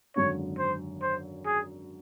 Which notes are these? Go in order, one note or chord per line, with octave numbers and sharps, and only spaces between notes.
G#1 F#2 D3 C#5
C5
C5
G#4